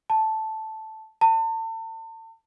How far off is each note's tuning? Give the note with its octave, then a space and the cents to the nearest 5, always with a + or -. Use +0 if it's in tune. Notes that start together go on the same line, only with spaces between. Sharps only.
A5 -5
A5 +35